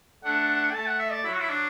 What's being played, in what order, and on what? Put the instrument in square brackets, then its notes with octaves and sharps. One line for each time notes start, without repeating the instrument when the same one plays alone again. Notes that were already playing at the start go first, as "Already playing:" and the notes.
[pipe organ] A3 D4 [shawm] F#5
[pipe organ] A3 [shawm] A5
[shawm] F#5
E5
D5
[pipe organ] F#3 [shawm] E4
[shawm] F#4
E4
D4